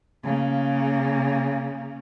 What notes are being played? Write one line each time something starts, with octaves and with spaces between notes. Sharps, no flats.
C#3 A#3